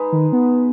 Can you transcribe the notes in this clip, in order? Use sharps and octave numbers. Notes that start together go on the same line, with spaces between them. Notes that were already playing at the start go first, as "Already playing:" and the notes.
Already playing: G#3 D#4 G#4 B4
D#3
B3